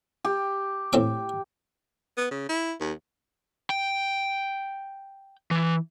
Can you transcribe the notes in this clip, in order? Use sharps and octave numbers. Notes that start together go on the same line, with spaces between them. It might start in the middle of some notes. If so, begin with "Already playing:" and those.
G4
A2 C4 D6
B3
C#3
E4
D#2
G5
E3